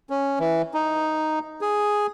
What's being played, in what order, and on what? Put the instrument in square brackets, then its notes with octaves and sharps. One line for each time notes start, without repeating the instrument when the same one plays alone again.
[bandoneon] C#4
E3
D#4
G#4